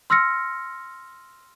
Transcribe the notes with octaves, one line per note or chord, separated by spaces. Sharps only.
C6 E6 F6 A#6 C#7